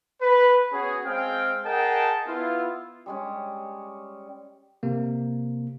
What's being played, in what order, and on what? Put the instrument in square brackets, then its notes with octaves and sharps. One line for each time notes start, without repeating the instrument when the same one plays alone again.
[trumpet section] B4
B3 C#4 F#4 G#4
G#3 C4 G#4 F5 G5
G#4 A#4 D#5 F#5 G5 A5
B3 E4 F4
[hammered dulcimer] G3 G#3 C#4
[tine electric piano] C3 A#3